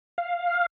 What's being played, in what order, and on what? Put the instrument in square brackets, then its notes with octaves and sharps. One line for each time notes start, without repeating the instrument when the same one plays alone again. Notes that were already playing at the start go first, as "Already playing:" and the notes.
[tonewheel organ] F5